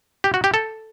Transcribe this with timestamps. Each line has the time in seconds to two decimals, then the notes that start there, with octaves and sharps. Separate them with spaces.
0.24 G4
0.34 F#4
0.44 G4
0.54 A4